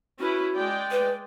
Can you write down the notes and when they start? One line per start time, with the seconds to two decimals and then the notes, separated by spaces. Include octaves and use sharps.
0.19 C#4 E4 F#4 B4
0.55 G#3 D5 G5
0.91 B4